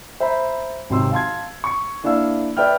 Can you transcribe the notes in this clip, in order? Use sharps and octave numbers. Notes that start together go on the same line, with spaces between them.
C5 E5 A#5 B5
G#1 C3 F#3 C6 E6
F5 A5 C6 G#6
C#6 C#7
A#3 D4 E4 F5 E6
B4 D5 E5 G5 F6